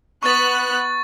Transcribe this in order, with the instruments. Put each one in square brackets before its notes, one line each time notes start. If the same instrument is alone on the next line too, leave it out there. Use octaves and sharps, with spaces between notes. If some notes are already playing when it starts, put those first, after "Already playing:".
[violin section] B3 F#6 [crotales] C#6 A6